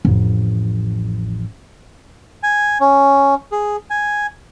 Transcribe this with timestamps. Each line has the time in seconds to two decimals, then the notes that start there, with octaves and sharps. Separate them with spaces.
0.05 A1 F2
2.43 G#5
2.80 C#4
3.52 G#4
3.90 G#5